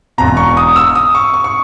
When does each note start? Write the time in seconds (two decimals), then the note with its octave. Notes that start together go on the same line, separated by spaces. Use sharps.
0.18 E1 E2 B2 A#5
0.37 C#6
0.57 D#6
0.76 E6
0.95 D#6
1.15 C#6
1.34 C#6
1.44 C#6